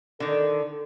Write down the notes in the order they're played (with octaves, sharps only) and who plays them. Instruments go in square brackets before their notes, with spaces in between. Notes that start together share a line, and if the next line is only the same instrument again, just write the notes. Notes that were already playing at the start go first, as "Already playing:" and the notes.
[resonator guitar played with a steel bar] D3 D#3 [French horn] A4